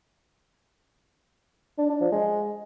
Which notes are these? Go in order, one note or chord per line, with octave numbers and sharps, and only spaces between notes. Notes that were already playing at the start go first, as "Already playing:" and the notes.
D4
D4
F3
G#3